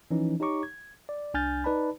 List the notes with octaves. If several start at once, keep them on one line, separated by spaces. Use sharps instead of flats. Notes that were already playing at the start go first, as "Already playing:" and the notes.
E3 F3 C#4 D#4
D#4 G4 C#5 A#5 C#6 D6
G#6
D5
C2 D4 G#5 F6 G6 A6
D#4 B4 D5 A5 B5